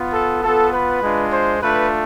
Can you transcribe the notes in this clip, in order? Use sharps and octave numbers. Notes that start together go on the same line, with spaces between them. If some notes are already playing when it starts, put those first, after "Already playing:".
Already playing: B3 F4
A4
B3 F4 A4
B4
G#3 D4 F4
C5
A3 D4 F4 B4